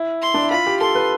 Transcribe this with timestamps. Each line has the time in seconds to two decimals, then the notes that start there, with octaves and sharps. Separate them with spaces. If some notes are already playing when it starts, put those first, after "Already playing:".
Already playing: E4
0.22 C6
0.34 D4
0.42 E4
0.51 F4 B5
0.67 G4
0.81 A4 C6
0.95 B4